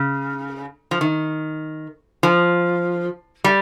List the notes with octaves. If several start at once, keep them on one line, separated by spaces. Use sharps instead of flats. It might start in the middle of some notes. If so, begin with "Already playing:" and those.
Already playing: C#3
F3
D#3
F3
G3